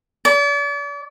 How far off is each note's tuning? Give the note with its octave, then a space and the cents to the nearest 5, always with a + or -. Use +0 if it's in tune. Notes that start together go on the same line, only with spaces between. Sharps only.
D5 -40